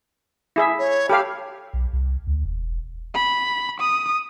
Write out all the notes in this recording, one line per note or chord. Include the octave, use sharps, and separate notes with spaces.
E4 G#4 E5
C#5
G4 A4 F5 B5
B1
C2
D2
E1
B5
D#6